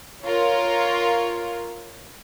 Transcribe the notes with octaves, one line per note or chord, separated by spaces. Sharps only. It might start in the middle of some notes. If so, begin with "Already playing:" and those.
F4 A#4 C#5